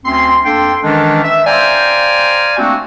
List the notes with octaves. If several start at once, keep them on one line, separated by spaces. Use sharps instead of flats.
D2 C4 C#4 C6
F2 A#3 D4 A4 G5 C6
D#3 E3 G#3 C#4 D4
E5
C5 D5 F5 G5 G#5 A#5
A3 A#3 C4 D4 F#4